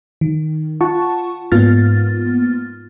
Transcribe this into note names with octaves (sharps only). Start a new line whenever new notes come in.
D#3
F4 F#5 A5 C#6
G#2 A#3 B3 F4 F6 A6